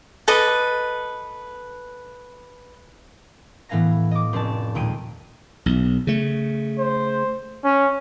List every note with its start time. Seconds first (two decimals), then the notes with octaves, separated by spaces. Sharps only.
0.28 A4 B4 D#5 D6
3.69 A2 E3 B3 F5 G#5 A#6
4.11 D#5 D6
4.33 F1 C4 C#4 D5 A5
4.75 D#2 A#2 G#3 G5 D7 D#7
5.66 B1
6.07 C#3 A3
6.79 C5
7.64 C#4